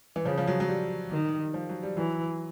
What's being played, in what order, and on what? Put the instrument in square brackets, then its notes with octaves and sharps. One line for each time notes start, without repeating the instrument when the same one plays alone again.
[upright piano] E3
[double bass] C#3 [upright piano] F3
[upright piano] F3
F#3
F#3
G3
[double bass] D#3
[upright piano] F3
F#3
G3
[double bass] E3 [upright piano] F#3